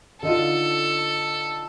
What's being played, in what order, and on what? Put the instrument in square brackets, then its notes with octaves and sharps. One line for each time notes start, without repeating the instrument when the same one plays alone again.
[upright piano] D3 D#4 F4 [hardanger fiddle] A4